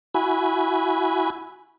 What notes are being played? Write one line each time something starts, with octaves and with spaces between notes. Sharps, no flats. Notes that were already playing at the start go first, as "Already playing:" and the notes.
E4 F#4 G#5 B5